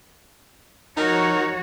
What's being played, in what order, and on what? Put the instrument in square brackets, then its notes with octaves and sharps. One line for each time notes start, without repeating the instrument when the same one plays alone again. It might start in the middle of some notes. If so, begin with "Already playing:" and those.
[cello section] F3 F#4 C#5 [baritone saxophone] D#4 [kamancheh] A#4